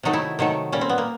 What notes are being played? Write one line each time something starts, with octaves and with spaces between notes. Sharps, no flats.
C3 D#3 F#3 A3 D#4
E4
C3 D#3 F#3 A3
A#2 G3 C#4
C4
B3
A#3